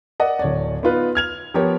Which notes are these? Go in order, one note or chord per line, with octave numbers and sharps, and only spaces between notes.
A#4 D5 D#5 F#5
D1 C#5 D5
B3 D#4 F4 B4
F6 G#6 F7
F3 B3 G4 A#4 C#5